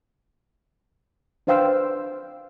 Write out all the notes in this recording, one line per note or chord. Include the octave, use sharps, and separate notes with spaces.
D4 B4 C5 F5 G5 E6